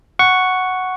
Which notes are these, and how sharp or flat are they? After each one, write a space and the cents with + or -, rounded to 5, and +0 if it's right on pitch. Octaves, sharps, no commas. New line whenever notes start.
F#5 +0 C#6 +0